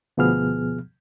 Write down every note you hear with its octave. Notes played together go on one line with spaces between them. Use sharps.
D2 B2 F3 B3 G#4 F6